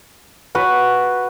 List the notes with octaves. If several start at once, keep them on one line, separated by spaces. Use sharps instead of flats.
F#4 B4